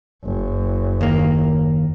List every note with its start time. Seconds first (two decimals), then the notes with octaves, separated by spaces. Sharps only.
0.25 F#1
1.01 D#2 A#3